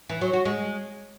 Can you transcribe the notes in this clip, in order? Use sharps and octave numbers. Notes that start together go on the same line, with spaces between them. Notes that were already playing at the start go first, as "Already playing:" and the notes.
E3
F#3
F#4
G#3